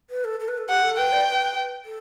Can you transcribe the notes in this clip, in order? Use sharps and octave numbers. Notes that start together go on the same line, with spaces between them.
B4
A4
A4
B4
A4
G4 F#5
A4
B4 G5
D5
B4
A4